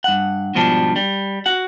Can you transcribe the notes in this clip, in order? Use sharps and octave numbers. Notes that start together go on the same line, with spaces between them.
G2 F#5
G#2 B2 F3 G3 D4
G3
F#4 F#5